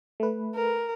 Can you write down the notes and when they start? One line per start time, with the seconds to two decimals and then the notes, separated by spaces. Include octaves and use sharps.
0.20 A3 B4
0.55 A#4